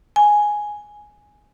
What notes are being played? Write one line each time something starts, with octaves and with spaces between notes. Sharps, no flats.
G#5